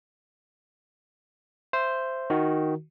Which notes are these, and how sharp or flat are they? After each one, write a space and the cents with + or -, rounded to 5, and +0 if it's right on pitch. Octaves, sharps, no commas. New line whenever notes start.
C5 +0 E5 +20
D#3 +0 F#4 -5